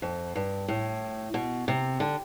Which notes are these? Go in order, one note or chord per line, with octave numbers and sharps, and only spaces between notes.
F2
G2
A2
B2
C3
D3